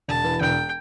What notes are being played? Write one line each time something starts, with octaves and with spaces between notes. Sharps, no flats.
E1 A5
E3
E1 G5